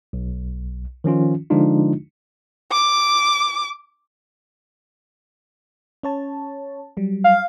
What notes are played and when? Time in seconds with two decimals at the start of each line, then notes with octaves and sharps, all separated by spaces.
0.13 B1
1.04 D#3 F3 C#4 F4
1.50 D3 F3 G#3 D4 D#4 F4
2.72 D6
6.03 C#4 C#5 A5
6.97 F#3 G3
7.24 F5